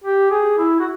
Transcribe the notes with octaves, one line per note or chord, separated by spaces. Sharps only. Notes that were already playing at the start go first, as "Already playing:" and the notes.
G4
G#4
E4
F#4